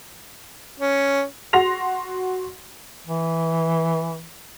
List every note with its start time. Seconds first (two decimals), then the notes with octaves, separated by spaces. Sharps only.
0.80 C#4
1.53 F#4 C6 A#6 F7
3.07 E3